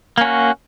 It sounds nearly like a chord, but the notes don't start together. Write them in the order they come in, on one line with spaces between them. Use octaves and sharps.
A#3 C#4 F#4